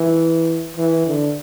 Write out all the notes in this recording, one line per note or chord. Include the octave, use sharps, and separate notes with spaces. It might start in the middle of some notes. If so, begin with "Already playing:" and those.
Already playing: E3
E3
D3